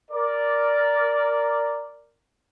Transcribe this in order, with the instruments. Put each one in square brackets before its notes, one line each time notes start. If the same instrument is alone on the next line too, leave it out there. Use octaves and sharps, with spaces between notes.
[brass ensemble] A#4 D5